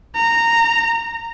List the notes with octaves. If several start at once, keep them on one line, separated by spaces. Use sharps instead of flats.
A#5